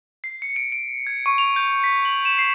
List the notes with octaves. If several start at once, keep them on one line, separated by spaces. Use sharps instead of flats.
C7
C#7
D7
D7
G#6
C#6
F7
G6
B6
F#7
E7
C7